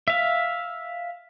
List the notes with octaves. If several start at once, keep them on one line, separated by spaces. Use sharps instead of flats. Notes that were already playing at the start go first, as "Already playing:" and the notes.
E5 F5